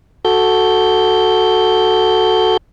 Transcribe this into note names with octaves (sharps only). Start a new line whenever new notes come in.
F#4 A4 G6